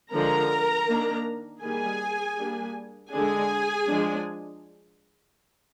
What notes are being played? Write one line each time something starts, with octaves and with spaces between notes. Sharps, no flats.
D3 F3 G#3 A#4 A#5
D#3 A#3 D4
D#3 G3 A#3 G#4 G#5
G3 A#3 D4
D3 G#3 D4 G#4 G#5
F3 G#3 D4